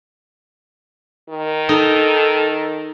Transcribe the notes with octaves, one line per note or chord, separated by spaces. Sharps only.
D#3
D#4 A4